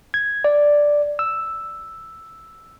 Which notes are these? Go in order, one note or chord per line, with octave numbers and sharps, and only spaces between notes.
G#6
D5
E6